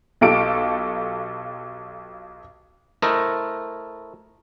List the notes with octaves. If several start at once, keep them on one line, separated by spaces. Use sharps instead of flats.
B1 F4 G4 A4 D7
A3 E4 A4 A#4 C5 D#5